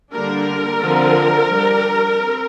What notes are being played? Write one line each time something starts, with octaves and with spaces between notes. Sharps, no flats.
D3 G3 A#3 D4 A#4
D3 F3 C4
G3 D4
C4